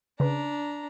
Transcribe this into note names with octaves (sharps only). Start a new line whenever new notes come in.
C#3 D4 B4 A#5